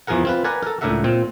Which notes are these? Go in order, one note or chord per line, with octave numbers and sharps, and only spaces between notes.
E2 E3 F3 G#4 A#4 F#5
C4 F4 B4
A#4 B4 D5 F#5 G#5
A4 A#4
C#2 A2 D4 A#4 E5 F#5
A#2 C4